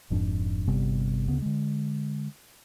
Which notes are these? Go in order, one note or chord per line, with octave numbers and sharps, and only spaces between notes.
F1 F2 G#2 D4
G1 C3 G3 B3
D2 C#3 B3
D3 G#3